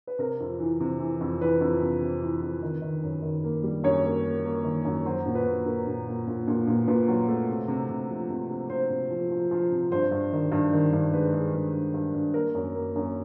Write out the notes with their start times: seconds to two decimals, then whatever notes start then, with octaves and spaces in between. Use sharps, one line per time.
0.07 B4
0.19 C3 A#4
0.40 F2
0.59 E3
0.80 C3
1.00 E3
1.21 F2
1.41 E3 B4
1.61 F2
1.82 C3
2.01 C3
2.22 E3
2.42 F2
2.63 D#3
2.82 D#3
3.03 F#2
3.22 D#3
3.44 A#3
3.64 G3
3.84 F#2 C#5
4.04 A#3
4.25 A#3
4.45 A#3
4.64 D#3
4.85 F#2
5.05 F#3 C5
5.26 A#2
5.35 B4
5.46 A#2
5.66 A#2 A#4
5.87 A#2
6.07 A#2
6.27 A#2
6.48 A#2
6.67 A#2
6.87 A#2 B4
7.08 F#3
7.28 A3
7.48 C3
7.68 C3
7.89 C3
8.09 F3
8.30 C3
8.49 C3
8.69 C3 C5
8.90 C3
9.10 F3
9.31 F3
9.51 F3
9.72 C3
9.92 G2 C5
10.11 G2
10.33 D#3
10.52 G2
10.73 D#3
10.93 G2
11.13 G#3 B4
11.33 G#3
11.54 G2
11.73 G2
11.94 G2
12.14 G2
12.34 A#3 A#4
12.55 F#2
12.76 A#3
12.96 F#2